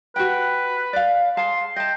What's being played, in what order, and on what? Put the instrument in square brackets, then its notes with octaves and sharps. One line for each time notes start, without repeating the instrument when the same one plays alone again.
[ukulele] F#4 G4 G5 [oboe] B4
[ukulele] D5 F5
[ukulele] G#4 F5 A5 [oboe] C6
[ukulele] D#5 A5 [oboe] G5